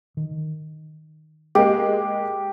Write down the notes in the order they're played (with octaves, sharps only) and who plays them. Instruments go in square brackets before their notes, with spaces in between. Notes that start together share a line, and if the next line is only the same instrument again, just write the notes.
[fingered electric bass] D#3
[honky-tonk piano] G#3 A#3 [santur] G4